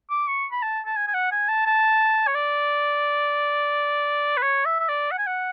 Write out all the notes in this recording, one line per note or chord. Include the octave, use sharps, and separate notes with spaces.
D6
C#6
B5
A5
A5
G#5
G#5
F#5
G#5
A5
A5
C#5
D5
B4
C#5
E5
E5
D5
F#5
G#5
F#5